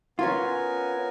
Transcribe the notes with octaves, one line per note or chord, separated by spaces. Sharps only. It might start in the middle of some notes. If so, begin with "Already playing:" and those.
B3 C#4 F4 A#4 G#5